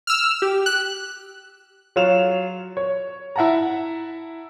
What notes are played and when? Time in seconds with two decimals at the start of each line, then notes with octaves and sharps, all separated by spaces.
0.07 E6 F6
0.42 G4
0.66 F#6
1.96 F#3 F4 C#5 E7 F7
2.77 C#5
3.36 E4 E5 F#5 A5 A#5